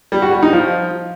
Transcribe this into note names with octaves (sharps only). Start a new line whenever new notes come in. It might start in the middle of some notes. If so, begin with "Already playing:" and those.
G3
F#4
G3
D#4
F3